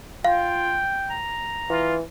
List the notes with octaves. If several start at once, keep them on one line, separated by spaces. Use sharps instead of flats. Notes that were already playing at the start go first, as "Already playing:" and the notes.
F4 F5 G5
A#5
E3 F4